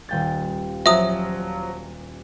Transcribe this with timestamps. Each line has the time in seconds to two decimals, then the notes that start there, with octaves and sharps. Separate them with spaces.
0.09 D#1 G5 A6
0.86 F3 F#3 E5 D#6